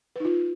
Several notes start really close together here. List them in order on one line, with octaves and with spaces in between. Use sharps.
B4 D#4 F4